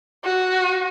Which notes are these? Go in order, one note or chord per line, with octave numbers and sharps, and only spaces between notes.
F#4